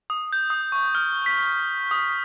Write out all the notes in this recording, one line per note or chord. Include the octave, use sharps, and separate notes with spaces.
D#6
G6
D#6
C#6
F6
B6
D#6